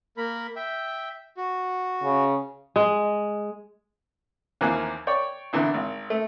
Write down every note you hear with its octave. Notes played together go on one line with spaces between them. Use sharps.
A#3 A#4 B5
E5 G5
F#4
C#3
G#3
D#2 E3 F3 A#3 G#5 F#6
C#5 D5 G5
A#1 E2 D3 E3
G#1
A3